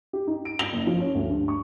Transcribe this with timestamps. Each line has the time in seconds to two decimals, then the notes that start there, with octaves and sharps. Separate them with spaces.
0.13 G4
0.27 D#4
0.45 D7
0.59 G7
0.73 F#1
0.87 F3
1.00 C#4
1.15 D2
1.30 G2
1.48 C#6